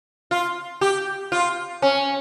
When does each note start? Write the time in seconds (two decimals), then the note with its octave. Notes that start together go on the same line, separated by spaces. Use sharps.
0.31 F4
0.81 G4
1.32 F4
1.82 C#4